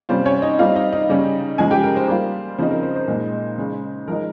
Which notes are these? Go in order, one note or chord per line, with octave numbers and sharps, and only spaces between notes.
C3 G3 C#4 F4 C5
C#4 C#5
D#4 D#5
G3 C4 D#4 F4 F5
D#4 D#5
D#4 D#5
C#3 G3 C#4
C#3 F3 G#3 D#4 G#4 G#5
G4 G5
A#4
C5
G3 A#3 F4
C#3 F3 C4 D#4 C5
A#4
C5
C5
A#2 G#3 D#4
C#3 G#3 D#4
F3 G#3 D#4 A#4